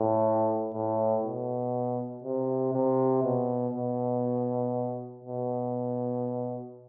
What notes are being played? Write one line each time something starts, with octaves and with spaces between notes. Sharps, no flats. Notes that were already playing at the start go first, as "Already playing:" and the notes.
Already playing: A2
A2
B2
C3
C3
B2
B2
B2